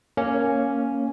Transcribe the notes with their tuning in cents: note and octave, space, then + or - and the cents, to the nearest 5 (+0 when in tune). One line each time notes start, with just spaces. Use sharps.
A#3 +0 C#4 +0